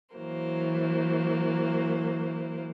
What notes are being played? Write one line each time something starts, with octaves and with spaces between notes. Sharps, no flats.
E3 F#3 A#3 C5